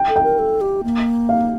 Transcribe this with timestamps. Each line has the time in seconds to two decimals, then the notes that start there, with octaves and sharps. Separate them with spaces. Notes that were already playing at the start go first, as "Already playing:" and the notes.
Already playing: G5
0.08 A4
0.16 G5
0.23 A#4
0.39 A4
0.61 G4
0.84 A#3
1.29 F5